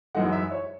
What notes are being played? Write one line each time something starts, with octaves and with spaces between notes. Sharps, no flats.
F#2 E3 G#3 D#4 F#5
E5
C#5